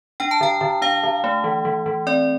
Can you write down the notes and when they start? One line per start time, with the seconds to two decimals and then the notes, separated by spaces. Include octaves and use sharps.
0.20 D4 G5
0.31 A5
0.41 D3 G5
0.61 D3
0.82 D4 F5
1.03 D3
1.24 A3
1.44 E3
1.65 E3
1.86 E3
2.07 C4 D5